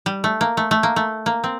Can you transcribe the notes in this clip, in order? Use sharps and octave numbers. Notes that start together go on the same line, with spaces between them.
G3
A3
A#3
A3
A3
A#3
A3
A#3
C4